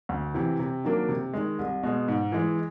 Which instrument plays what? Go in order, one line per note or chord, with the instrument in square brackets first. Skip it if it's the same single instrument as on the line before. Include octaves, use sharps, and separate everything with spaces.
[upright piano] D2
C3 E3
C3
D#3 F#3 A#3 D4
C3
D#3 G#3
C2
B2 G#3
G#2
E3 G#3